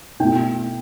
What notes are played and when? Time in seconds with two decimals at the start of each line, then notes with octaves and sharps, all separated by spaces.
0.20 B2 A3 E4 G5